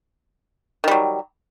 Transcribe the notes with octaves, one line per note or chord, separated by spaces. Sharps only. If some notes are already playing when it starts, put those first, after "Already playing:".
D#3 F#3 G3